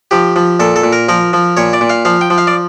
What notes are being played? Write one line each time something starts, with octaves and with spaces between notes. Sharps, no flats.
F3 G4
F3
A#2 A4
A4
A#2
A#4
F3 A#4
F3
A#2 C#5
D5
A#2
F5
F3 F5
G5
F3
F5
D5